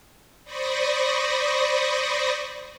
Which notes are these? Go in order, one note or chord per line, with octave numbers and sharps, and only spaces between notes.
C5 D5 B5 C#6 D#6 A#6